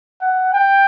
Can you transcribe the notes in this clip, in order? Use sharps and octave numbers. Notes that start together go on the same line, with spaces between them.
F#5
G5